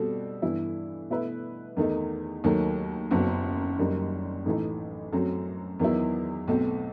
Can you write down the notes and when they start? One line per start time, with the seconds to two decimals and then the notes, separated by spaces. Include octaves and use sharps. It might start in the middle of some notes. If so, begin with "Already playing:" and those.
Already playing: B2 G3 C4 F#4 A4
0.42 G2 E3 B3 E4
1.10 B2 A3 E4 B4 E5
1.77 E2 D#3 A3 D#4
2.44 D#2 D#3 F#3 A3
3.11 F#1 F#2 F#3 B3
3.79 F#1 F#2 D#3 G3
4.46 A1 A2 E3 A3 D#4
5.13 F#2 F#3 A3 C4 F#4
5.80 E2 D#3 F#3 B3 E4
6.48 B1 B2 A3 C4